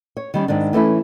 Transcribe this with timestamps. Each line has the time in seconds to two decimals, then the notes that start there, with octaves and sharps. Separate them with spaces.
0.17 C#5
0.34 D#3 G3 C#4
0.48 G#2 D#3 C4 D4
0.73 E3 A3 C#4 E4